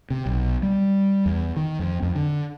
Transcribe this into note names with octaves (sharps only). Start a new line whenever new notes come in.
C3
B1
G3
E2
D#3
F2
F2
D3